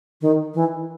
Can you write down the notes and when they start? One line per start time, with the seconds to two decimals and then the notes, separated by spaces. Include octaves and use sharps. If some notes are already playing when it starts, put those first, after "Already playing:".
0.21 D#3
0.54 E3